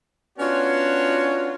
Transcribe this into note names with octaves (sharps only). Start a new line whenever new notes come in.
B3 C#4 D4 F4 F#4 C#5